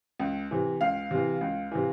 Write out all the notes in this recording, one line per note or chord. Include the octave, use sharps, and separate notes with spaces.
C#2
C3 E3
C#2 F5
C3 E3
C#2
C3 E3